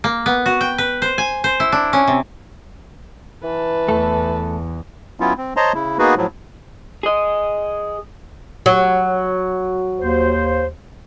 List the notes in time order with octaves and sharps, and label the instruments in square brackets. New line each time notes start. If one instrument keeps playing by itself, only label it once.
[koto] A#3
B3
F#4
G5
B4
C5
G#5
C5
E4
D4
C#4
C3
[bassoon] E3 [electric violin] B4 A5
[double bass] E2 [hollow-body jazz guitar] A3 A4
[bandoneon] F#3 B3 C#4 E4 F4
C4
C5 C#5 D#5 A5 A#5 C6
C#3 E4
A#3 B3 D#4 F#4 G#4 B4
A2 F3 F#3
[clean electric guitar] G#4 D#5
[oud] F#3
[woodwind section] D#2 C5